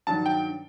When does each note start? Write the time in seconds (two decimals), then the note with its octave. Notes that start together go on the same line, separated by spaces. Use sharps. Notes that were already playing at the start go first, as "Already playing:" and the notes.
0.07 G2 D#3 F#3 A5
0.26 G5